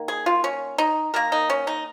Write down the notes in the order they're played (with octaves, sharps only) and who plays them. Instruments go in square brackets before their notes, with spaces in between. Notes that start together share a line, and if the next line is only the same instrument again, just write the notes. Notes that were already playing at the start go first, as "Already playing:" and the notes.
Already playing: [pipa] D#3 A#3
G#4
F4
C#4
D#4
D#3 A#3 A#4
D#4
C#4
D#4